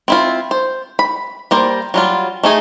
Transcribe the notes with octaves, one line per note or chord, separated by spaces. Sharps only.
C4 E4 F4
C5
B5
G3 A#3 C5
F#3 G3 F4
A3 D#4 G#4